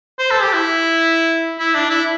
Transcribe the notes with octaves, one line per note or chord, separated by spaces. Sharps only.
C5
A4
G4
E4
E4
D4
E4